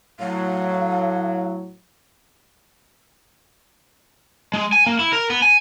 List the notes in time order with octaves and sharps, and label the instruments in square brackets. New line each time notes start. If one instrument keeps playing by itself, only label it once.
[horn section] A2 F#3 [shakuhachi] F5
[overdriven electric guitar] G#3
G#5
A#3
E4
A#4
B3
G#5